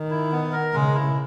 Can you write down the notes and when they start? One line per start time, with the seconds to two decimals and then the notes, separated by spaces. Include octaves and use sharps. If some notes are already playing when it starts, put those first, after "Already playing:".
Already playing: D#3
0.11 E4
0.32 B3
0.53 A#4
0.73 C#3 G#3
0.94 E4